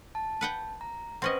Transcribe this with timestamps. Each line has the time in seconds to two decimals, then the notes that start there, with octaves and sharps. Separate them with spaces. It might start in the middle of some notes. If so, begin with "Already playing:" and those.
0.15 A5
0.41 B4 F#5 G5
0.81 A#5
1.22 C4 C#4 B4 C5 D#5 F#5